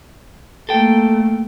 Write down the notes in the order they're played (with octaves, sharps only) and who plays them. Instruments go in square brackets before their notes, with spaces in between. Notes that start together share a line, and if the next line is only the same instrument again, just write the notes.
[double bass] A3 A#3 [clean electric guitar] A4 G5